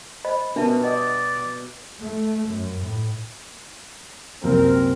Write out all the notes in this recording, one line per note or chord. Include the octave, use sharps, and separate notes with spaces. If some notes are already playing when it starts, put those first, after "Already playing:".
C5 D#5 B5
B2 G3 B3 C#4 D4 A#4 E5 A5
D5 D#5 F#5 D#6
A3
F#2
A2
C2 F#2 A#2 C4 A#4